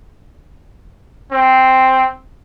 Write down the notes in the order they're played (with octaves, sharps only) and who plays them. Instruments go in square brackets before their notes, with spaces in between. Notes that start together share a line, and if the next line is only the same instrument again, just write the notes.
[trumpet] C4